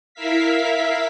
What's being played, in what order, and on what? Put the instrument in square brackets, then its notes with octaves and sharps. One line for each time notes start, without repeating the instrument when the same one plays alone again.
[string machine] E4 A#4 E5 F5 B6